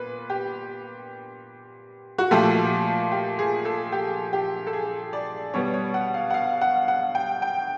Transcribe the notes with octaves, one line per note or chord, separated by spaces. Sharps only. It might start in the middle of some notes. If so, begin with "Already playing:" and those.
Already playing: A#2 B3 B4
G4
F#4
A#2 F3 A3 G4
G4
G#4
A4
G4
G4
A4
G#4
D5
B2 G3 B3 C#5
C#5
F#5
F5
F#5
F5
F#5
F#5
G5
G5